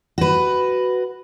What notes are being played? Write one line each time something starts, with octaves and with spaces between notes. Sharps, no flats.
F#4 B4